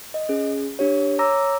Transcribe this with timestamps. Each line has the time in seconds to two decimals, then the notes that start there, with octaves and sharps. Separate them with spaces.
0.14 D#5
0.29 C#4 G#4
0.79 D4 G4 C#5
1.19 C#5 A#5 D6 E6 A#6